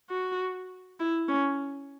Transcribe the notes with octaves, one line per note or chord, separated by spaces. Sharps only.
F#4
E4
C#4